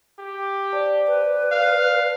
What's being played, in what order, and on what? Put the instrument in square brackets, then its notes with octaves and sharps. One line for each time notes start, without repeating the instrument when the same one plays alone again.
[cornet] G4
[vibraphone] C5 D5 A5
[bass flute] B4
[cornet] F5